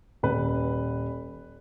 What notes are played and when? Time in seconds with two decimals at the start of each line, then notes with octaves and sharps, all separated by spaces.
0.23 D#1 B4